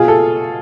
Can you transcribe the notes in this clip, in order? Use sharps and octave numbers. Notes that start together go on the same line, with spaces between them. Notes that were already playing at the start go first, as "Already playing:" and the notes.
Already playing: B2 F4 G#4
A4